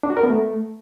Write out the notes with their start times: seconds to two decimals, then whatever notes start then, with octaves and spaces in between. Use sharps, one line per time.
0.03 D4
0.10 F#4
0.17 A#4
0.23 B3
0.30 A3